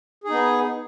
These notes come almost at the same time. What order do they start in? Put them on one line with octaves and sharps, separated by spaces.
G#4 D#4 B3